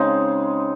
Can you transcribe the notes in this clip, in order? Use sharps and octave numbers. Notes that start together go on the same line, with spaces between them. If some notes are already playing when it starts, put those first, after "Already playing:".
Already playing: C#3 G#3 C4 D#4